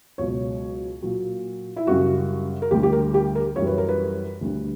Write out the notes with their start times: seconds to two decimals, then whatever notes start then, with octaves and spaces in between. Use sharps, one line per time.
0.18 C#2 B2 F#3 C#5
1.02 A#2 F#3
1.76 E4
1.87 F#2 C#3 G3 F#4
2.62 A#4
2.71 D2 D3 G3 G4
2.83 G4
2.92 A#4
3.14 G4
3.35 A#4
3.56 F#2 E3 G3 C#5
3.67 B4
3.78 A#4
3.89 B4
4.41 D2 D3 G3